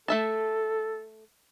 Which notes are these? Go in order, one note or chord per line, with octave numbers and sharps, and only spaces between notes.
A3 A4 E5 A5